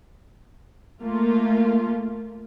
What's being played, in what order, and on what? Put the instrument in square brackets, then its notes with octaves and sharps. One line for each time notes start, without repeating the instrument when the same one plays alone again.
[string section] A3 A#3 F4